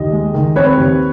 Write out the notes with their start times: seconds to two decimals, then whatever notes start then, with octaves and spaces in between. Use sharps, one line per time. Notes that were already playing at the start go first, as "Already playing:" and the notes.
Already playing: D#2 D#5
0.12 G#3
0.34 D#3
0.56 C4 B4 C#5
0.77 D#2